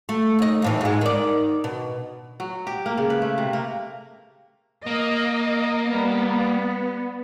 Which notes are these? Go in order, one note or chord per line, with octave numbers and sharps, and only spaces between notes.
A3
D#2 D#5
D#2 A2 E3
G#2 G#3
D#3 D5
B2
F#3
G4
A#3
C#3
B4
A3
C3
A#3
A#3 D#5
G3 B3